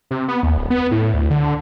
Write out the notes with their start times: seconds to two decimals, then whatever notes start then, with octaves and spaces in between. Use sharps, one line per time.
0.11 C3
0.28 B3
0.43 D#2
0.57 D1
0.70 B3
0.91 A2
1.14 D2
1.30 D3